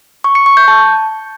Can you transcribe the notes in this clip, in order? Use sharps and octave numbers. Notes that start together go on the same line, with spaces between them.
C#6
C#7
C#6
G6
A5